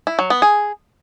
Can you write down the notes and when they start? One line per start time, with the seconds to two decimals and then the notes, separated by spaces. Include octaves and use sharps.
0.07 E4
0.19 F#3
0.30 B3
0.42 G#4